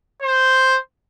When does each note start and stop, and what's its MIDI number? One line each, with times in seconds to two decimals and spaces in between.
0.22 0.77 72